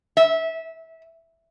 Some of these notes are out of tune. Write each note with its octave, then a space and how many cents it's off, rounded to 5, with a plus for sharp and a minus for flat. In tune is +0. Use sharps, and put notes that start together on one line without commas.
E5 -20